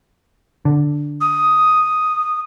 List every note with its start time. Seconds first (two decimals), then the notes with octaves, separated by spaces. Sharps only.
0.65 D3
1.21 D#6